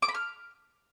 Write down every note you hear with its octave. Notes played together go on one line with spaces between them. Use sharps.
D6
B5
F6